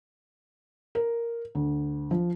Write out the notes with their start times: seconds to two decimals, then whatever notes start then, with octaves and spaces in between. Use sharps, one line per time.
0.95 A#4
1.55 D2
2.11 F3